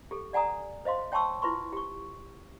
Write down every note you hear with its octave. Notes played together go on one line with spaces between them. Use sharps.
G4 A4
D5 F#5 G#5 A#5 D#6
C5 D#5 F5 C6
C#5 G5 A5 C6 C#6 E6
E4 F4 B4 C6 C#6
G4 C#6